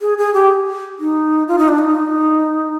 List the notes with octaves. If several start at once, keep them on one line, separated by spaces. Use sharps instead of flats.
G#4
G#4
G4
D#4
F4
D#4
D4
D#4